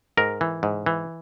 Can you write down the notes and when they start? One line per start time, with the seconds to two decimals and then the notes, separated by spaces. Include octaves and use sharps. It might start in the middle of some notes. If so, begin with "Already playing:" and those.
0.17 G#2 A#4
0.41 E3
0.63 G#2
0.86 E3